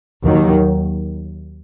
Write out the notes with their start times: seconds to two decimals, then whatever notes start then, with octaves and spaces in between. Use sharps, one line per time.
0.23 D#2 D#3 F#3